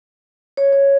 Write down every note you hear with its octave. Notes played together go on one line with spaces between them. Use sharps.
C#5
C#5